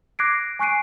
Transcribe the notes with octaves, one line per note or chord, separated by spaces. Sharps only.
D6 F#6 G#6 A#6 C7 D7
G#5 C#6 F#6 C7 D7 D#7